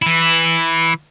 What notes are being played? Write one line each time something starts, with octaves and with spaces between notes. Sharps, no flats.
E3 E4